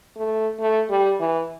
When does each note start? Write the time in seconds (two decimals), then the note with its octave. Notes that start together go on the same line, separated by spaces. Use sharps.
0.16 A3
0.60 A3
0.90 G3
1.20 E3